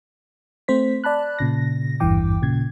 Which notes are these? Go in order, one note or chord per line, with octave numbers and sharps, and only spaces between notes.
A3 C4 C5 B6
D5 A5 B5 F#6
A#2 C#3 A#6
G#1 E2 G2 E3 G5 D6
A#2 C#3 G#6